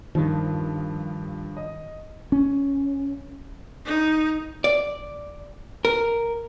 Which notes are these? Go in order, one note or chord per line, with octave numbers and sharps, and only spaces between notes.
G2 D#3 F3
D#5
C#4
D#4
D5
A#4